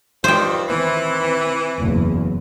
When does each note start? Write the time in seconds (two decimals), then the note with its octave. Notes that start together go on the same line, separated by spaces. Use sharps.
0.24 G2 D#3 F3 C5 G5
0.69 D#3 E3 C4
1.78 F#1 E2